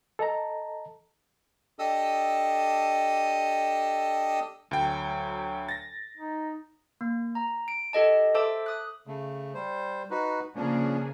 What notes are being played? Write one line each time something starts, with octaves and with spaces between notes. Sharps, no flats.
A4 D#5 A5 A#5
D4 G4 A4 D#5 D#6 E6
D2 F#3 G5
A6 A#6
D#4
A#3
A#5
D7
G4 A4 D#5 A5
A4 C5 E5 A5 D6 E6
D#6 F#6
C#3 A3
G3 C5
D#4 F#4 B4
C#3 F3 A#3 C#4 D4 G#4